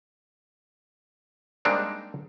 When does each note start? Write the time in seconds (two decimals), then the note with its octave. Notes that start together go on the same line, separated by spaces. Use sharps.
1.65 G3 G#3 A#3 C4 D4 D#4